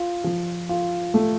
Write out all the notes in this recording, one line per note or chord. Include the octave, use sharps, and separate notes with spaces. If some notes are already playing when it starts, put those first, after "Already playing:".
Already playing: F4
F3
F4
A3